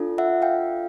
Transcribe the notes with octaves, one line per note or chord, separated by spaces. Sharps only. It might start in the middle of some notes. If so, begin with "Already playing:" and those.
Already playing: D4 F4 A4
E5 F#5
F5 G5